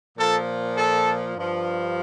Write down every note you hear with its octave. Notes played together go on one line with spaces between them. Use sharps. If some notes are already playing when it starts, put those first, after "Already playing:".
A#2 F3 A4
A4
G2 F3